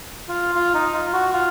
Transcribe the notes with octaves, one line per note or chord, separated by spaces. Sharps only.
F4
F4
D#4
F4
F#4
F4